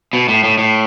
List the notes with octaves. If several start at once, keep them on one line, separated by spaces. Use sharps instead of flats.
B2
A2
A2
A2